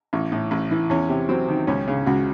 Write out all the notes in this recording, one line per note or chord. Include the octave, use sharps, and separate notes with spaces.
A1
A2
A1
E3
E2 C#4
C3
F#3 C4
D#3
C#2 C#4
C#3
C#2 F#4